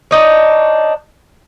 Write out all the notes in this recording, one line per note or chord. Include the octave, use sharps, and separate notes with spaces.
D4 D#4 C#5